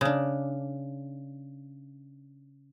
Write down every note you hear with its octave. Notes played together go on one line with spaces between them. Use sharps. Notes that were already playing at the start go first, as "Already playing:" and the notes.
C#3 D4